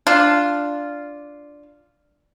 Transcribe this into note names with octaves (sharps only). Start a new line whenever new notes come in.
D4 F4